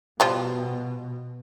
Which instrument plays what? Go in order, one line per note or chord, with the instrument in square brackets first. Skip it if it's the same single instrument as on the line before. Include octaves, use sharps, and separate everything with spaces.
[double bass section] B2 [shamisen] F3 G3 F4